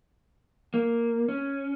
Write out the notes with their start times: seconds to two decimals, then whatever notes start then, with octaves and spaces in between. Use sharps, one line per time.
0.74 A#3
1.28 C#4